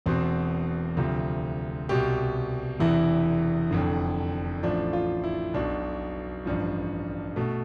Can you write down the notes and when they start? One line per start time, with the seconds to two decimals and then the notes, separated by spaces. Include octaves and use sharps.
0.06 E1 E2 B2 C4
0.97 D2 C3 F3
1.89 C2 B2 G4
2.80 E1 E2 C3 E3 E4
3.71 F1 F2 D3
4.63 A1 A2 F3 D4
4.93 F4
5.24 E4
5.54 B1 B2 D4
6.45 A1 G2 F3
7.36 B2 A3